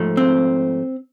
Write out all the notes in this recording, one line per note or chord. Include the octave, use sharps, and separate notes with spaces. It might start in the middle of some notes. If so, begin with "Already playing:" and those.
Already playing: G#2 F3 A3
C4